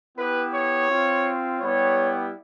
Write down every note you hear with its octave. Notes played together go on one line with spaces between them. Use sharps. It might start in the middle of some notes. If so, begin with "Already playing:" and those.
B3 E4 G4 B4
C#5
C4 F4
G3 B3 E4 G4 C#5